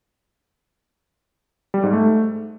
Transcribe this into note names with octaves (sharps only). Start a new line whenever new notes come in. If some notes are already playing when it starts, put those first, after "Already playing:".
G3
G#2
A3